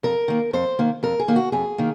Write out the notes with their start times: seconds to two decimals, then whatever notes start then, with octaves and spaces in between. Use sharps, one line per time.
0.03 F2 A#4
0.28 D#3 A#3
0.53 F2 C5
0.79 D#3 A#3
1.03 F2 A#4
1.19 G#4
1.28 D#3 A#3
1.36 F#4
1.52 F2 G#4
1.78 D#3 A#3